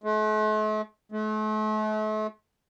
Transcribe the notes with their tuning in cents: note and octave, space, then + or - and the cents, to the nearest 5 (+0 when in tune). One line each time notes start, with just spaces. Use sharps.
A3 -45
A3 -40